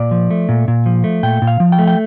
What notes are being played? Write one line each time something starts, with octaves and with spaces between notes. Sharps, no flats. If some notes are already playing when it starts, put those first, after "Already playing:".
Already playing: A#2 D5
F3
A3
A#2
A#2
F3
A3
A#2 G5
A#2
F5
F3
G5
A3
G5